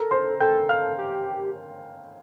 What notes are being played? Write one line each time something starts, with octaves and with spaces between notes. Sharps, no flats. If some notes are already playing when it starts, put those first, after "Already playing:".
Already playing: A4 A#4 A#5
C5 C6
A4 G5 G6
F5 F6
G4